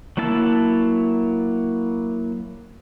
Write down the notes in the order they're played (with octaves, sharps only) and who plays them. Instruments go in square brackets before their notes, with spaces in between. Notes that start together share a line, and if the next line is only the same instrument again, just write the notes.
[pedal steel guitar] F#3 A#3 E4 A5 E6